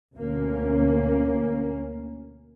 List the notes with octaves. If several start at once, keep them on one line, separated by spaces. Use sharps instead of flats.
D2 B2 A#3 C#4